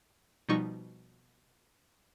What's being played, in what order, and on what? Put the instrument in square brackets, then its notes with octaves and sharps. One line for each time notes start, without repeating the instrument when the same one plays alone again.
[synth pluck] B2 F3 G3 D#4 C#6